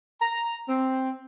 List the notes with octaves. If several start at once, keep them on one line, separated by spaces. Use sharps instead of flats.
A#5
C4